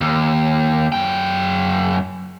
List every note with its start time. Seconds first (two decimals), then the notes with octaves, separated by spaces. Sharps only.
0.01 D#2
0.92 F#2 G5